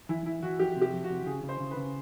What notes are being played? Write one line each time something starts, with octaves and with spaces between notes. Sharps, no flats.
E3 E4
E3 E4
E3 F#4
F2 G4
C3
G4
F2
F#4
C3
C#3 G#4
C#3
C5
C#3
B4
C#3